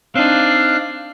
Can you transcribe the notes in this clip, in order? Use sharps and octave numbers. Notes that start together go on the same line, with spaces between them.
C4 D4 D#4 F5 F#6